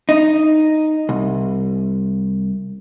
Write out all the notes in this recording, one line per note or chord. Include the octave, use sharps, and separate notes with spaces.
D#4
C2